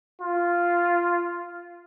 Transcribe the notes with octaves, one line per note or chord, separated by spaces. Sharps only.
F4